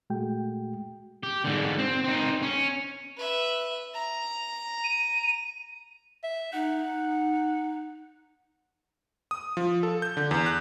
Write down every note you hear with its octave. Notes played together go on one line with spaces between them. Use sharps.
A#2 G#3 A3 F#4 G5
G4
G#2 D3
C4
C4 D#4
C#4
B4 E5
A#5
D#7
E5
D#4 F#5
D#6
F3
A4
G6
D3
E2
F#6